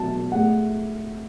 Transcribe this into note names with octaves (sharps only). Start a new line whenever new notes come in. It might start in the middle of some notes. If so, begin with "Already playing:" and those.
Already playing: B2 F#3 A5
A2 G#3 F#5